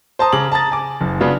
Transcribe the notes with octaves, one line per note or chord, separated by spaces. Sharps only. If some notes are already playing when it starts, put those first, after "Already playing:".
C5 A5 A#5 D#6
C#3 A#5 D6 F#7
A5 A#5 D#6 A6
G#5 D6
F#1
C#3 B3 D4 F4 F#4